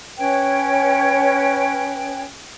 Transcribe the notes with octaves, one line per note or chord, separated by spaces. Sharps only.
C#4 B4 C#5 G5